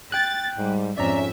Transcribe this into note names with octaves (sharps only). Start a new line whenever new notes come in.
G5 F#6 A6
G#2 G3
F2 G#2 C#4 D5 E5 A#5